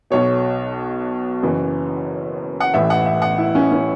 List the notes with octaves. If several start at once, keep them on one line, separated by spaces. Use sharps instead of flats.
B1 B2 C#5
F#1 F#2 E3
F#5
A1 A2 E3 E5
F#5
E5
F#5
E4
C#4
C#4